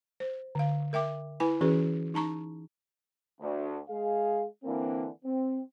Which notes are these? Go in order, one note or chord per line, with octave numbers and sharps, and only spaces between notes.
C5
D3 F5
A#4 E5 G5 D6
E4 B4 G#5 B5
E3 C#4 F#4 G#4 B4
D#4 A5 A#5 C#6
D2
G#3 G#4 F5
D3 E3 A#3 C4
C4